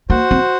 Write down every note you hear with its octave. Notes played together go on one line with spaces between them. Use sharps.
A#3 F#4 C5 F#5
C4